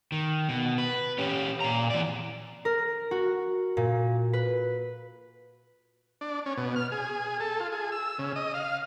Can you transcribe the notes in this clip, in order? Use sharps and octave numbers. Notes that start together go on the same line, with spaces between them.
D#3
B2
B4
C#4 G4
A#2 A#5
E3 D5
A#4
F#4
A#2
B4
D4
C#4
B2
F6
G#4
A4
F4
G#4
E6
C#3
D#5
F5